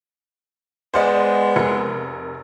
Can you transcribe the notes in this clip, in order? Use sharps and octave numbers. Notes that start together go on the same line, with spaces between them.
G#3 B3 C5 D5 D#5
F1 A#4 C#7